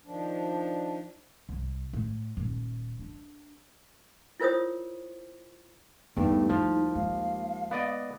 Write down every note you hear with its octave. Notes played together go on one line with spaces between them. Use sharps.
D#3 F3 D4
C2
A2
D#1
D4
E4 F4 A#4 C5 C#5 D#6
E2 G2 G3 A3 B3 D#4
D#2 F3 E4
G#3 F5
B3 D5 D#5